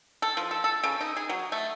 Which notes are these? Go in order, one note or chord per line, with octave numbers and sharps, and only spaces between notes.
A4
F3
A4
A4
C#3
D#4
G#4
F#3
A3